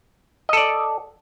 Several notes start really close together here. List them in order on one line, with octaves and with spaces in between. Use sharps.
D#5 A4 D5